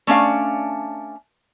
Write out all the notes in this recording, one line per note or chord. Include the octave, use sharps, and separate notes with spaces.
A3 C#4 D4 F5